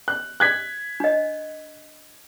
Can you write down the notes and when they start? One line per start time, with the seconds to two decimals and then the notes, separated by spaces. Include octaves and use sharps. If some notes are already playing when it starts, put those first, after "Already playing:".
0.08 F#6
0.40 F#6 G#6 B6
1.00 D4 D#5